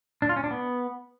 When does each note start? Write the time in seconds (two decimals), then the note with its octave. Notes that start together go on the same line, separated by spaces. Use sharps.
0.22 D4
0.29 F4
0.36 C#4
0.44 D4
0.51 B3